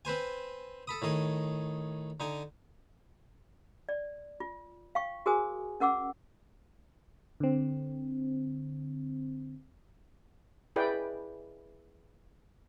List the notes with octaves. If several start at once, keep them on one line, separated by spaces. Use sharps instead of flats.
C4 B4 C5 G#5
A4 B5 D#6
A2 D#3 G#4 D#5
D3 D#4 G#5
D5
F4
F5 G5 C#6
F#4 G#4 A#4 C5 G#5 D#6
C#4 A#4 F#5 D6 E6
D3 C4
E4 G#4 B4 D5 G5